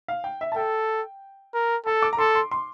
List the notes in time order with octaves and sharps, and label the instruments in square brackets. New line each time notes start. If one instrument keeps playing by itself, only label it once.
[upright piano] F5
G5
E5
A5
[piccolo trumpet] A4 [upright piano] G5
[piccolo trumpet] A#4
[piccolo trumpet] A4 [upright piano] A5
[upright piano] D6
A#5
[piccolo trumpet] A4 [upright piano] C6
[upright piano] C6
C6